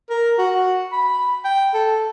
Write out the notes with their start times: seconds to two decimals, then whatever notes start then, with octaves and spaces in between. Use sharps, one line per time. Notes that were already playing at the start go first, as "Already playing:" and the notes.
0.10 A#4
0.39 F#4
0.92 B5
1.44 G5
1.74 A4